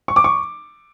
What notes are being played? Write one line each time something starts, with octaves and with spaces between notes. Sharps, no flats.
C#6
D6
C#6